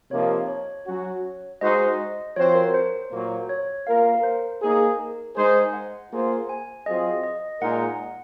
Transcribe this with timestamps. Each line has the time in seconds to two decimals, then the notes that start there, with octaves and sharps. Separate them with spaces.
0.11 C3 F3 A#3 D#4 C#5
0.48 C#5
0.86 F#3 C#4 F#4
1.61 G#3 D#4 F#4 C5 D#5
2.36 F3 C4 F#4 C5 C#5
2.55 A#4
2.74 C5
3.12 A#2 F#3 A#3
3.49 C#5
3.87 A#3 F4 A#4 F5
4.15 A#4
4.23 C5
4.62 A#3 D#4 G#4
4.99 A#4
5.36 G#3 D#4 G#4 C5
5.73 F#5
6.12 A#3 F4 G#4 C5
6.49 G#5
6.86 F#3 C4 F4 G#4 C5 D#5
7.23 D#5
7.62 A#2 G#3 D#4 A#4 F#5